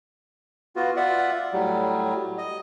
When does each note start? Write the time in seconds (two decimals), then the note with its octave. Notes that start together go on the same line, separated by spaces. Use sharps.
0.76 B3 F4 F#4
0.96 F4 D5 E5 F#5
1.53 A2 F#3 G3
2.38 D#5